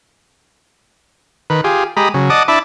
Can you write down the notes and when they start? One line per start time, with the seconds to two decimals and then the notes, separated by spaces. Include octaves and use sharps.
1.50 D#3 B4
1.64 F4 G4 G#4
1.97 G#3 G4 A#5 B5 D#6
2.14 C#3 F#3
2.30 D5 D#5 F#5 A5 D6 D#6
2.48 D4 E4 E5 A5 B5 D6